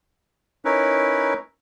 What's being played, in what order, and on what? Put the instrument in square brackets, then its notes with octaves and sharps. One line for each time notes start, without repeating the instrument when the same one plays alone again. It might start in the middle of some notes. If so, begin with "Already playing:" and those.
[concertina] C#4 D#4 E4 A#4 B4 C#5